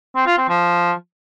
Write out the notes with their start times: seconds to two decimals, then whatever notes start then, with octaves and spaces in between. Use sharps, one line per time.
0.15 C4
0.26 F4
0.38 C4
0.49 F3